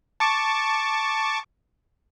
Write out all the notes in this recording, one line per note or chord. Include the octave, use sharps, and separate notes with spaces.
A5 C#6 D6